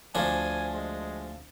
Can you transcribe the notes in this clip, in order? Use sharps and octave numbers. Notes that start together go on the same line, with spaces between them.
D2 F3 D4 G#5
G#3